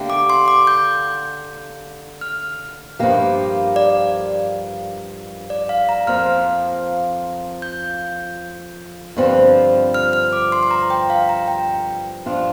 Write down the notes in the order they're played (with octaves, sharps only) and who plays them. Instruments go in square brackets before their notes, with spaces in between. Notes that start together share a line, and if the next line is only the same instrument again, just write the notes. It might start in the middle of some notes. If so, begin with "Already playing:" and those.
Already playing: [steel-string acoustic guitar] D3 A#3 G4
[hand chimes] D6
C6
D6
G6
F6
[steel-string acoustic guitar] G2 F3 A#3 G4
[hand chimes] D5
D5
F5
A#5
[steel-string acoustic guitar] F2 F3 A#3 [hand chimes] F6
[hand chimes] G6
[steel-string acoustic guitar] G2 D3 F3 C4
[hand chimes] F6
F6
D6
C6
C6
A#5
A#5
G5
F5
A#5
G5
[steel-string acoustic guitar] G2 F3 D4 F4